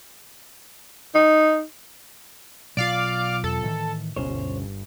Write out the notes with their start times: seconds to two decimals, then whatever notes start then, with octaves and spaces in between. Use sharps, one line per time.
1.15 D#4
2.77 B1 F4 D5 F5 D6
3.44 E2 A4
3.63 A2 D#3 E3
4.16 G1 D2 B2 C#4 C5 C#5